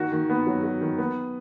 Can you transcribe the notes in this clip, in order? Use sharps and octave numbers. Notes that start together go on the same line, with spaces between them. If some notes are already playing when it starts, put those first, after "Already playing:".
Already playing: D#3 F#4
D#3
B3
F#3
F#4
D#3
B3